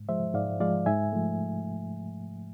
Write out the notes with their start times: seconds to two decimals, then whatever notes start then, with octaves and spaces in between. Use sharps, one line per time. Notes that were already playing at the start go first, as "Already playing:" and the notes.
Already playing: G#2
0.09 F3 G#3 C5 E5
0.34 G#2 D5 F5
0.60 F3 G#3 D5 F5
0.86 G#2 E5 G#5
1.12 F3 A3